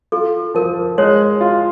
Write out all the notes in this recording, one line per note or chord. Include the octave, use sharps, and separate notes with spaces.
F4 A4
F3 A#4
G#3 C#5
F4